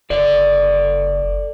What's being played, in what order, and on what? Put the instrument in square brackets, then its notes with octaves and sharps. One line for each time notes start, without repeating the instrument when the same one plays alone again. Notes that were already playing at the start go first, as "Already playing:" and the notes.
[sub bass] F#1 [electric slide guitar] A4 D5